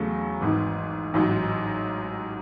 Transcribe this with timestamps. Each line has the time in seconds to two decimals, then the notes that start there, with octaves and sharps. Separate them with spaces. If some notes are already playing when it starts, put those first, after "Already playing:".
Already playing: E2 C#3 F#3 A3
0.41 G#1 G#2 E3
1.14 A1 G#2 F#3